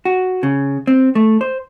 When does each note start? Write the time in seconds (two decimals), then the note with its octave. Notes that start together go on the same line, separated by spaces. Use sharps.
0.05 F#4
0.43 C#3
0.87 C4
1.15 A3
1.41 C5